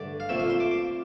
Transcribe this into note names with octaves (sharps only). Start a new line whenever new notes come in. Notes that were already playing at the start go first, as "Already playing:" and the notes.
Already playing: G2 D3 A3 D5
F5
A#2 A3 C4 E5
F5
C6
D6
D6